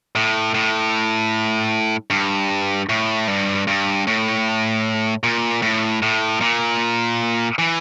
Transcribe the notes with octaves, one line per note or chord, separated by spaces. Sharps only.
A2
A2
G2
A2
G2
G2
A2
A#2
A2
A2
A#2
E3